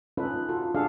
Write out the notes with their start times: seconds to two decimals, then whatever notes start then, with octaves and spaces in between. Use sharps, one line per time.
0.17 C#4 D#4 F4 A4 B4
0.49 F4 F#4 A4
0.75 D4 F#4 G#4 A4 D#5 F5